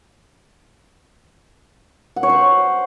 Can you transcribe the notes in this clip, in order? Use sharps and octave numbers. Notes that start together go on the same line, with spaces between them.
F#5
C#5
C5